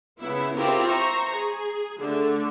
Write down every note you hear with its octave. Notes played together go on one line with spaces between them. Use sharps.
C#3 B3 E4
C4 E4 F4 G4 A#4
C5 A#5 C#6
G#4
D3 A3